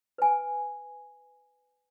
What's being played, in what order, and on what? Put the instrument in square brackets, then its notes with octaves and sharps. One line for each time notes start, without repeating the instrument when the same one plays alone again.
[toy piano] B4 G#5